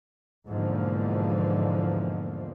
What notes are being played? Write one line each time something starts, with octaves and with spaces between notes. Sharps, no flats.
E2 G#2 B2 D3 F3 A#3